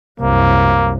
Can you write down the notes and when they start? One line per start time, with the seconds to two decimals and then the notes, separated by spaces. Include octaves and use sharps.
0.20 C2 F#2 A#3